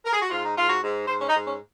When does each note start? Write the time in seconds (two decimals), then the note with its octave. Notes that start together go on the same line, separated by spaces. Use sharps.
0.04 A#4
0.12 G#4
0.21 F#4
0.30 G#2 F4
0.44 D#4
0.55 G#2 F4
0.69 F#4
0.82 G#2
1.07 G#2 C5
1.20 C#4
1.28 D#4
1.34 G#2
1.47 C#4